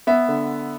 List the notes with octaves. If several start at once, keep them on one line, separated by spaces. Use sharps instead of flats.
B3 E5
D3